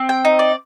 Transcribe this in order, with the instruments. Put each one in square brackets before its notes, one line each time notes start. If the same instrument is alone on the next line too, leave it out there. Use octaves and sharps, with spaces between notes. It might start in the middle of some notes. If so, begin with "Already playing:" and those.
Already playing: [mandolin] C4
G5
D#4
D5